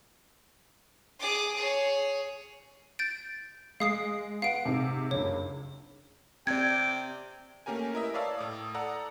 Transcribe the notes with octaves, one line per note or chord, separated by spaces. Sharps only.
G#4 D6
G#4 C#5
G6 A6 D7
G#3 F5 D#6 C7
B3 F5 F#5 D7
G#2 C3
F#1 C#2 G2 C#5
C3 C4 D5 G5 G#6
A3 A#3 C#4 G4 A#4 G#5
E4 A#4 B4 D#5 E5
B4 C#5 D5 F5 A5 E6
A2 D6 D#6
A4 D5 F#5 A#5 E6